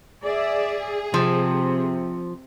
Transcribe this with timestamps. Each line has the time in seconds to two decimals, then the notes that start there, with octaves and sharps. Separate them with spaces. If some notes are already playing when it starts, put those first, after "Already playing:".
0.24 G#4 D5 E5
1.14 C3 F3